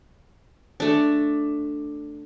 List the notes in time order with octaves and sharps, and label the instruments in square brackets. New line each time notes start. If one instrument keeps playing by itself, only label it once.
[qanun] A3 D4